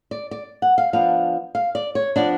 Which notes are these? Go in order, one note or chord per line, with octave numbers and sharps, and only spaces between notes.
D5
D5
F#5
F5
F3 B3 D4 F5
F5
D5
C#5
F3 B3 D4 D5